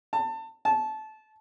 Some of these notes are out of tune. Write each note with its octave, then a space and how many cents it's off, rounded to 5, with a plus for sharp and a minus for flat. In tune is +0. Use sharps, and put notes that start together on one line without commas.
A5 +25
A5 -20